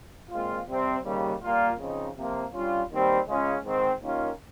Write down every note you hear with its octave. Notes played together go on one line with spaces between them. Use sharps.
A#2 G#3 C4 F4
C3 G3 C4
D#2 C#3 G3
A#2 G3 A#3 F4
C#3 F3 C4 D#4
C3 F3 A#3 F4
G2 G3 C#4 F4
D#2 D#3 G3 C4
C#3 G#3 C#4 F4
G#2 D#3 G#3 C4
D#2 D#3 A#3 C#4 F4